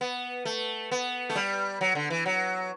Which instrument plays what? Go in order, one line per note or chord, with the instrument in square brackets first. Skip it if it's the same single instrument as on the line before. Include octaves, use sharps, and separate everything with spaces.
[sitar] B3
A3
B3
A3
G3
F#3
D3
E3
F#3